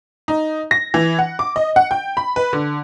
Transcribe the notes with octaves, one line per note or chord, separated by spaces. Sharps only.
D#4
A#6
E3
F#5
D6
D#5
F#5
G5
B5
B4
D3